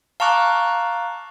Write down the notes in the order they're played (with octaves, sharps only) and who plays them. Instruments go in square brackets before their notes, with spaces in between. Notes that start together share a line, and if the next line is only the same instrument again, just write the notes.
[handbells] F5 A5 A#5 C#6 D6 F#6